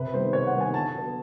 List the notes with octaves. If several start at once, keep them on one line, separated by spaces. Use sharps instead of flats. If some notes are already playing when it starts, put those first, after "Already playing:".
Already playing: C3 B4
D#3 G3 B3 C5
C3 C#5
F#5
D#3 G3 B3
G#5
D3 A5
F#3 B3